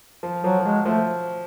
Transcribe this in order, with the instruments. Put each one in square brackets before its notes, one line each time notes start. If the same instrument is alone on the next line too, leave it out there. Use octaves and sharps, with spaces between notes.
[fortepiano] F3
[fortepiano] F3 [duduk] F#3
[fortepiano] F3
[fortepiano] F#3 [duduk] G#3
[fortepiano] F3 [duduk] A3